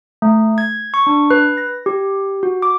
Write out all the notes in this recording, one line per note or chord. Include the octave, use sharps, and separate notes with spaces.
A3
G#6
C#6
D4
B4
A#6
G4
F#4
D6